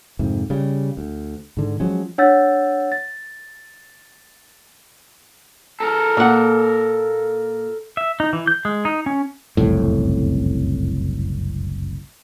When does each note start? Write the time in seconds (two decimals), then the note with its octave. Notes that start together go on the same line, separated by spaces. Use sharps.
0.19 F2 G#2 C3
0.50 C#3 G3
0.97 D2
1.57 G#2 D3
1.80 F3 F#3 G#3 C#4
2.18 D4 C#5 F#5 E6 G6 A6
2.92 A6
5.80 A4 A#4
6.17 A#2 F#5
7.97 E5
8.20 D#4
8.33 E3
8.47 G6
8.65 G#3
8.85 D#4
9.06 C#4
9.57 F#1 C2 F2 A2